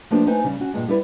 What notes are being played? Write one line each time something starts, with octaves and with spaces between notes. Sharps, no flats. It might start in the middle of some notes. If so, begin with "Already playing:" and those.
F3 A3 A#3 D4 G4 B4
A3 D#4 B4 C5 G#5
C#3 G3
C#4 F#4
G2 A#2 G#3
G3 E4 B4